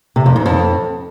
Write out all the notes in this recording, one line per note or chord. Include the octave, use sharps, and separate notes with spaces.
C3
F2
G#2
F2